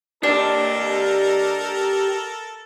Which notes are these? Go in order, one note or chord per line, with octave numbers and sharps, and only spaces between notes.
D4 G4 A4 A#4 D#5